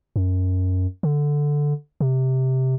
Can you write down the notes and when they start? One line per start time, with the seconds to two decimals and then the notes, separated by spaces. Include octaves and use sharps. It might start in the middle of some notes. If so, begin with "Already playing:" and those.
0.16 F#2
1.03 D3
2.01 C3